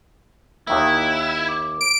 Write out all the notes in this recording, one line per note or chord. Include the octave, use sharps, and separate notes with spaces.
D#2 D#3 A#3 E4 E5 E6 F#6
D6
D7